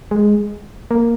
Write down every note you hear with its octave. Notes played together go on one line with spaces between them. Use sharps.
G#3
A#3